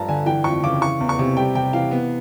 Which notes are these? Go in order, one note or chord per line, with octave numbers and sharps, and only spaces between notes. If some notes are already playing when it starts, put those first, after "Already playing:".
Already playing: G2 F3 A5 A#5
D3 G#5
E3 G5
F2 C#6
C#3 D6
E3 C#6
E2
C#6
C3
G3 G5
C3 G5
E3 F5
B3